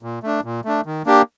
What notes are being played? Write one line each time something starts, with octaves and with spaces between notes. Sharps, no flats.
A#2
A3 D4
A#2
A3 D4
D#3
A#3 D4 G4